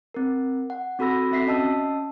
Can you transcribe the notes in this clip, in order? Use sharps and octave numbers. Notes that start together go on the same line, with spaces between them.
C4 A#4
F#5
C4 F#4 A4 B5 E6 A#6
C4 F#4 E5 B6 C7
C#4 D#5 A5 E6